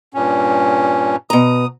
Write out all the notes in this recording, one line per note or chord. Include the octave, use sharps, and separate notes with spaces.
G2 A#2 C#4
B2 A#5 D#6